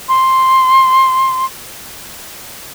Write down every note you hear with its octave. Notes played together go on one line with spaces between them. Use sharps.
C6